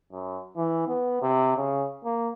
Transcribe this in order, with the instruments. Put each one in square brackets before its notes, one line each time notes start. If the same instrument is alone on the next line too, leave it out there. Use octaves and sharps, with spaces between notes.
[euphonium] F#2
E3
B3
C3
C#3
A#3